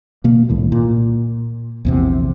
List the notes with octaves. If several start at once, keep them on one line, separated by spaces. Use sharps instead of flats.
B2 A#3
C2 A2 D#3
A#2
A#1 E2 C3